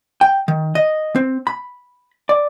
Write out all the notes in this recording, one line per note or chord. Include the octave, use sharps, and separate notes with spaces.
G5
D#3
D#5
C4
B5
D5